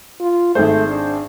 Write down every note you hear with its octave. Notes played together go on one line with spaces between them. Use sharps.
F4
G#1 A3 G#4 C5
D4